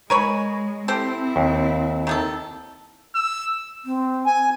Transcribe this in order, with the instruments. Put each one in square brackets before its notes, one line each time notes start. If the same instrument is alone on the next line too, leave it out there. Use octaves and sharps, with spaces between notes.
[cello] G#3 [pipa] A#4 C#5 B5 [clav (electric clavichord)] G#5
[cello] C4 E4 [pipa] G4 A4 C5
[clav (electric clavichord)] D#2
[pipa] D#3 G#4 A4
[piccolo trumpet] E6
[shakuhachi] C4
[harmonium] G#5